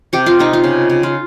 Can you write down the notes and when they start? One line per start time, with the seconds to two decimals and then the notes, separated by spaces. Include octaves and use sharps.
0.13 C3 G4
0.26 F4
0.39 C3 D#4
0.53 F4
0.64 C#3
0.90 C#3
1.03 F4